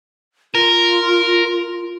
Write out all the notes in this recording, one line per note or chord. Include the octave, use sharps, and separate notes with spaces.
F4 A#4